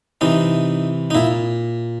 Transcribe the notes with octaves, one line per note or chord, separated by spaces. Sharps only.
C3 E3 D#4
D#4
A#2 E4